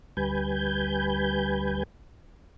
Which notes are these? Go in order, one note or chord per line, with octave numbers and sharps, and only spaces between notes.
D2 G3 B4 G#5 G6